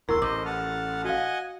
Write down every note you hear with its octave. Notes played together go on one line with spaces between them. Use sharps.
D1 E2 E4 A#4 C6 C#6 E6
A1 C5 D#5 D6
F#5 A5 F6
F#4 D#5 F5 F#5 G#5